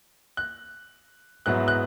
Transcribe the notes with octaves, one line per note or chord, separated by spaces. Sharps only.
F#6
G#2 F#3 B3 E4 F#6
F#6